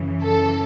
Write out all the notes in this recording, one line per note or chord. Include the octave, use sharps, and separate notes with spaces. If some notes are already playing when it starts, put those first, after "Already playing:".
Already playing: F#2 C#3 E3
A4